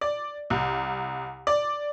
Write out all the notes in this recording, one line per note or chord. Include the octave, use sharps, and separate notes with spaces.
D5
C2
D5